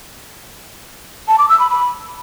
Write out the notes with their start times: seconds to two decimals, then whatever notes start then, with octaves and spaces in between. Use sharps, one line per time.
1.28 A5
1.39 D6
1.49 E6
1.60 B5
1.70 B5